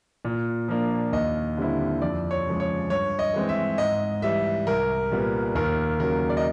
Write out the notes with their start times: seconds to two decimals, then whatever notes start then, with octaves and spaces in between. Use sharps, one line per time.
0.25 A#2
0.68 F3 A#3 D4
1.13 D#2 D#5
1.57 D3 G3 C4 E4
2.02 F2 D5
2.31 C#5
2.46 C#3 F3 G#3
2.60 C#5
2.90 G2 C#5
3.19 D#5
3.34 E3 G#3 C4
3.49 E5
3.78 G#2 D#5
4.22 E3 G3 E5
4.67 C2 A#4
5.11 A#2 G3 B3
5.55 D#2 A#4
5.99 C#3 F#3 A#4
6.30 D5
6.37 D#5